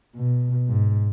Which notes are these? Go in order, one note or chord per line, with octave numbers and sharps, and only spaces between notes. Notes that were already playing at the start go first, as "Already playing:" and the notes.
B2
G#2